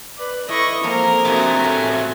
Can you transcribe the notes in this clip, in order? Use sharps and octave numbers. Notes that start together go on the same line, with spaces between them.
B4 D5
A3 E4 D#5 C#6
F3 G#3 A#3 C4 A4 A#4
C3 A3 D4 F#4 A4 D#5 G#5
A2 A5